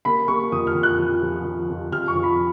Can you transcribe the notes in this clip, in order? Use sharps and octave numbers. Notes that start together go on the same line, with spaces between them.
A#3 B5
A#3 C#6
F2 D#6
F6
F2
F#6
F3
F3
F3
F2
F2 F6
C#6
F3
B5